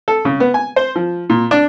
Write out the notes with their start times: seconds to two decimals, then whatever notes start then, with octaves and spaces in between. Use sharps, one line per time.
0.08 A4
0.25 C#3
0.40 B3
0.54 G#5
0.76 C5
0.95 F3
1.30 A#2
1.51 D4